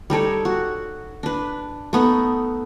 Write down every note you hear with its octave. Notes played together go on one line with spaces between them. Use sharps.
G3 D#4 A4 C#5
F#4
D4 B4
A3 B3 D#4